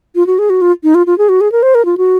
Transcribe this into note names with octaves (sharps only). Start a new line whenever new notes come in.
F4
F#4
G#4
F#4
F4
D#4
F4
F4
G#4
F#4
G#4
A#4
C5
A#4
F4
F#4